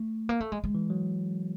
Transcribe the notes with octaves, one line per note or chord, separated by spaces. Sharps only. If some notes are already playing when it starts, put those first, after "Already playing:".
Already playing: A3
A#3
A3
G#3
G#3
E3
F#3